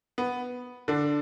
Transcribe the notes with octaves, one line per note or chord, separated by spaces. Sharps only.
B3
D3 D4